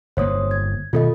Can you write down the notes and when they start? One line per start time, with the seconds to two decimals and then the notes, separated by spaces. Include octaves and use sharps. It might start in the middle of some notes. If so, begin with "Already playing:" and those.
0.17 G1 A#3 C5 C#5 D#6
0.51 G#6
0.93 B2 D#3 F4 A4 D#5